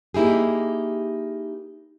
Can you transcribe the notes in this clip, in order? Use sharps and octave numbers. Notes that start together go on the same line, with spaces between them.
A#3 D#4 E4 G4 G#4